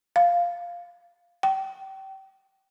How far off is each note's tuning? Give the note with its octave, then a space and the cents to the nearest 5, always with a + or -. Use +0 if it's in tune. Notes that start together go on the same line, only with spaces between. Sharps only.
F5 +0
G5 -30